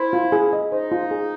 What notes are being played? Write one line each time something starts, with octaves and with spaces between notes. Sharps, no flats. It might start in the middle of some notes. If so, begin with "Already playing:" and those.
Already playing: E4 C5
F4
G#4
D#5
D#4 C5
F4
G#4